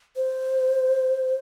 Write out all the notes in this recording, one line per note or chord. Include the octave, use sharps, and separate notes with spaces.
C5